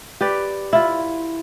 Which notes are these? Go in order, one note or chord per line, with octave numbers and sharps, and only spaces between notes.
G4 B4 D5
E4 F4